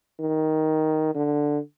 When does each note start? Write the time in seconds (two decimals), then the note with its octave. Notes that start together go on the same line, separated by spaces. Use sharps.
0.20 D#3
1.15 D3